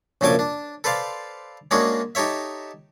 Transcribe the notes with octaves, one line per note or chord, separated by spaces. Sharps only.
A#1 F#2 C#3 A4 G#5 D6
D4
A4 B4 C5 D5 F5
G#3 A#3 C#4 D4 F#4 G#4
D#4 G4 A4 C#5 E5